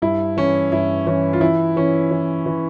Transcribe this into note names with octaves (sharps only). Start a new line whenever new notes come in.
G2 E4
E3 C#4
G2 E4
E3 C#4
F4
E3 E4
E3 C#4
E3
E3